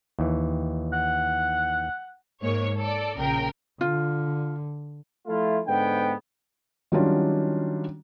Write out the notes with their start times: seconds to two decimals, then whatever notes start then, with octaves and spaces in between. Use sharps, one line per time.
0.19 D#2 E3
0.93 F#5
2.43 G#2 A#3 C#5
2.77 A4 D5
3.15 A#1 C#3 A#4 G5
3.81 D3 F4
5.27 F3 A3 E4 F4
5.66 G#2 D3 B3 G5
6.92 D#3 F#3 G3 C#4 D4 F4